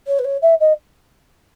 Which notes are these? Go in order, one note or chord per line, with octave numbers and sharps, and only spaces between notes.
C#5
B4
C#5
E5
D#5